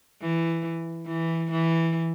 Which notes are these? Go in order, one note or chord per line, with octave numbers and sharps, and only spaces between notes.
E3
E3
E3